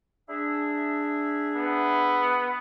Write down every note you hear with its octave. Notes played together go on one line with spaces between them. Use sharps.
D4 G#4 E5
B3